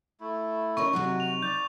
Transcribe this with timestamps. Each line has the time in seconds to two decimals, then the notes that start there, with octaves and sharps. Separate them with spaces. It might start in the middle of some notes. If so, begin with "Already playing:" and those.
0.20 A3 E4
0.77 C#4 D#4 A#4 C#6
0.93 C3 F#3 D#4 F#4
1.20 F7
1.42 D5 G6